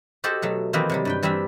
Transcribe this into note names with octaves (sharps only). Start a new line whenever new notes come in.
F#4 G4 A4 C5 D#5 F#5
B2 F#3 A3
D#3 E3 A#3 C4 D#4 B4
C3 F#3 G3
G2 B4 G5
E3 G3 C4 D4 E5